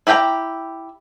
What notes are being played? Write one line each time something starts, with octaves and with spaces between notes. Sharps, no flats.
E4 G4 F5 G5 A#5